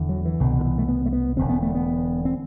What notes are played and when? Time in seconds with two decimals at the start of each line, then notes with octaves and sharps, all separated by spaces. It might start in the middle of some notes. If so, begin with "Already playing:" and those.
Already playing: E1 E2 D3
0.09 F#3
0.25 E3
0.40 C2 B2 D3
0.59 D3
0.65 E3
0.78 A3
0.88 B3
1.06 A3
1.13 B3
1.37 E1 E2 D3 C4
1.49 B3
1.62 A3
1.75 B3
2.25 C4